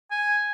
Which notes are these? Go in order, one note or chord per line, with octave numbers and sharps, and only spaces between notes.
G#5